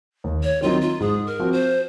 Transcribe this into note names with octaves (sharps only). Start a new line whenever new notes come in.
D#2
C#5
D#3 F#3 C4 D#4 F4
F4
G#2 G#4
A#4
F3 C4 F#4
C5